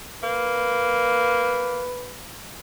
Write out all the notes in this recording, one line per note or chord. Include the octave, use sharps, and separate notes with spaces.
A#3 B4